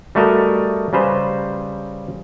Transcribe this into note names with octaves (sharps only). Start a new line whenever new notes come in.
G3 A3 F#4 A#4 D#5
C#3 G3 B4 C5 A#5